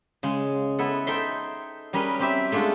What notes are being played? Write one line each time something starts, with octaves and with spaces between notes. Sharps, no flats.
C#3 G#3
B3 E4 A4 F#5
D#4 A4 C5 E5 G5 C6
G3 C#4 A#4 B4 D#5
C4 G4 E5
G#3 A3 D4 F4 F#4